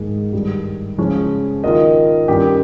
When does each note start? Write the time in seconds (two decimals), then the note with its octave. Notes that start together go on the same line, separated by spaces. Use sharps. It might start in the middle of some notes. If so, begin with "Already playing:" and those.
Already playing: G#2 D#3 A#3 D#4 G#4
0.33 G2 D#3 G3
0.98 C#3 F3 G#3 C#4
1.63 D#3 A#3 F4 A#4 D#5
2.28 G2 D#3 A#3 C#4 G4